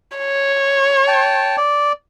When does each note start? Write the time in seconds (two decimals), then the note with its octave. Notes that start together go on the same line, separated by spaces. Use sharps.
0.18 C#5
1.08 G5 A5
1.58 D5